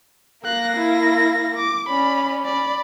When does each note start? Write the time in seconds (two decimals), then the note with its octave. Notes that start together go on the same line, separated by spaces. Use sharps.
0.44 A#3 F5 F#6 A#6
0.74 E4 F5
1.55 D6
1.89 C#4 D5 B5
2.45 D5 B5